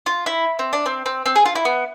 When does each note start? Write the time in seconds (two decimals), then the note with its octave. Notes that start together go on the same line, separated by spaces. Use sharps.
0.06 F4
0.26 E4
0.59 C4
0.73 D4
0.86 C4
1.06 C4
1.26 C4
1.36 G#4
1.46 F4
1.55 E4
1.65 B3